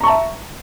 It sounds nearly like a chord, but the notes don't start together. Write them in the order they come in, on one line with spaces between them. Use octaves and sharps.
A#5 C#6 A5 E5